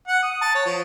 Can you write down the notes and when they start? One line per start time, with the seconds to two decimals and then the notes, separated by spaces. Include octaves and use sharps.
0.08 F#5
0.23 D#6
0.41 A5
0.55 C#5
0.66 F3